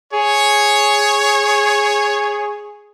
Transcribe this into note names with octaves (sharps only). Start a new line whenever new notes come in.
G#4 C#5